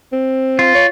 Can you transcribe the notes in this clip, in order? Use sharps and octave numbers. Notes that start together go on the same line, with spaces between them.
C4
F4
C#5